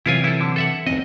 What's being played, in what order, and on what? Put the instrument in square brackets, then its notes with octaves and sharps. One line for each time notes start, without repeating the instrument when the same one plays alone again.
[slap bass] C3 E3 F#3 [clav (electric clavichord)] E4 F4 G#5
[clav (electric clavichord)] E4 A4
D3
A4 E5 F#5
[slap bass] D1 B1 C4 [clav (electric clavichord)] D#5